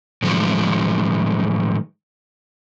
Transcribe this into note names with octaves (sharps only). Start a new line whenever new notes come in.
A2 D3 D#3 F3 F#3 G#3